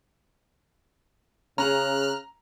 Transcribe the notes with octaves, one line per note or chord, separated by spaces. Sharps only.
C#3 C#4 G#4 A#5 F6 F#6